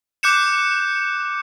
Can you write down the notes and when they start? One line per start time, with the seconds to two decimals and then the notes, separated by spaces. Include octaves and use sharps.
0.23 D6 F#6 G6 C#7 E7